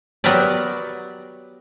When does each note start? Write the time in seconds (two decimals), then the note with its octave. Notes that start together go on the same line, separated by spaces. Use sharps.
0.24 F#3 B3 G4 A#4 B4 D5